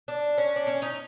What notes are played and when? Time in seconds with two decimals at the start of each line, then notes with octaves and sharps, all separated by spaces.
0.08 D4
0.38 C#4
0.56 D4
0.67 C#4
0.82 D#4